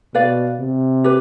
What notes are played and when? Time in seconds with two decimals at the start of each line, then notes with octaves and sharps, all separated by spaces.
0.15 B2 B4 D5 F5
0.60 C3
1.04 G4 B4